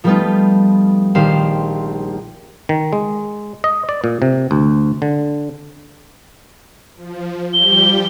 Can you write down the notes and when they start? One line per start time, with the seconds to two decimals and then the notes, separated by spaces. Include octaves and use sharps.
0.04 F3 G3 A3 B3 D#4 F4
1.15 A#1 D#3 G4 C5 F5 C7
2.69 D#3
2.93 G#3
3.64 D#5
3.89 D5
4.04 A#2
4.22 C3
4.51 D2
5.02 D3
6.97 F3
7.53 F3 G3 G4 G7